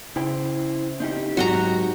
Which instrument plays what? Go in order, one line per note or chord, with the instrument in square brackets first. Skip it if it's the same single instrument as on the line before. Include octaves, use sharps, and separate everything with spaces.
[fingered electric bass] C#3 [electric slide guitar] E4 C5 G5
[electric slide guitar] C4 D#4 G4
[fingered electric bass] G#2 F#3 [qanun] F#4 D#5 A#5